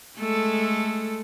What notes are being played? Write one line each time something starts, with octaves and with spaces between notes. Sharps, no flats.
G#3 A3 A4